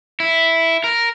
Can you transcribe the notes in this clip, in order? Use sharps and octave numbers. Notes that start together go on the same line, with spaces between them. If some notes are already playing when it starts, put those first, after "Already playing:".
E4
A#4